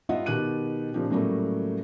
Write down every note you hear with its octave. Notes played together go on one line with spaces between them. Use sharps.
G2 G3 F4 D#5 E5 F#5
B2 D#3 G4 F#6 D#7
A#2 C#3 F3 D#4 G4
A2 C#3 F#3 G3 A3 A#3